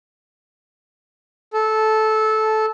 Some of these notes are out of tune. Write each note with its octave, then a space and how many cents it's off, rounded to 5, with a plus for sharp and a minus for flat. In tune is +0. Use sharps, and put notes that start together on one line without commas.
A4 -15